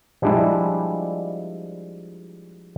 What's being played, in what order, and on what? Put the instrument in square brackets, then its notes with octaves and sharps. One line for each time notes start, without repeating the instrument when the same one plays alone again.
[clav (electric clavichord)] F3 G3 G#3 D4 E4